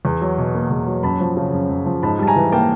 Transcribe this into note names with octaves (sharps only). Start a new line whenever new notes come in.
E2
F#3
B2
A#3
E2
F#3
F#2 A5 B5
F3
C#3
F#2
F#2
F3
G#2 A5 B5
G3 A5
G#5 A#5
E3
A#3 G5 A5